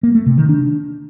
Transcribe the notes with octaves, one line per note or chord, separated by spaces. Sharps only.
A#3
A3
C3
D#3
D4